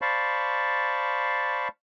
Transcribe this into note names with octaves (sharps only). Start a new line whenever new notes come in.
C5 D5 F5 A5 B5 C#6